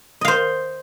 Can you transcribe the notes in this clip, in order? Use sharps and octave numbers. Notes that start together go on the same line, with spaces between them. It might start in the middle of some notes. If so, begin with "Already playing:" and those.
C5 D#5 F5